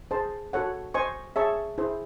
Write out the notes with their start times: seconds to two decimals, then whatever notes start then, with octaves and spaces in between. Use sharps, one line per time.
0.11 G#4 C5 D#5 A5 C6
0.53 F#4 A4 C#5 F#5
0.94 C5 D#5 G#5 C#6
1.36 G#4 C#5 E5 A5 C#6
1.78 E4 G#4 C5 E5